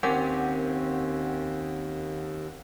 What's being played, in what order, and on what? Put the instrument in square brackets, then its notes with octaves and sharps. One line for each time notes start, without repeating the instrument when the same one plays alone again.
[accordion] D#2 [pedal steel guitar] C4 C#4 G4 [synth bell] A#4 F#5